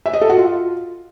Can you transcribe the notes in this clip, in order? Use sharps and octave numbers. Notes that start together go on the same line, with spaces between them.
E5
D#5
A4
F#4
F4